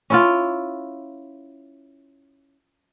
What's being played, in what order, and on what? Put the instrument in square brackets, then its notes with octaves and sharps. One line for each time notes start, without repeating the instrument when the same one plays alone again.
[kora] C#4 E4 F4